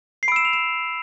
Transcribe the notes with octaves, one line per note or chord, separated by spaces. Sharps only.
C7
B5 E6 D7 E7
F7
E7